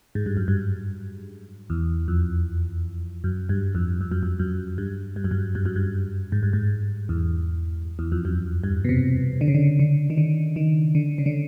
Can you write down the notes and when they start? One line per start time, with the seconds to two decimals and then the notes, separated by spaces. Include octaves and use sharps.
0.15 G#2
0.26 G2
0.37 F#2
0.48 G2
1.70 E2
2.08 F2
3.24 F#2
3.49 G2
3.75 F2
4.01 F2
4.11 F#2
4.23 F2
4.40 F#2
4.78 G2
5.16 G2
5.24 F#2
5.31 G2
5.55 G2
5.66 F#2
5.76 G2
6.32 G#2
6.43 G2
6.53 G#2
7.09 E2
7.99 E2
8.12 F2
8.25 F#2
8.64 G2
8.85 B2
8.89 C3
9.41 D3
9.48 C#3
9.55 D3
9.79 D3
10.10 D#3
10.18 D3
10.56 D#3
10.95 D3
11.18 C#3
11.26 D3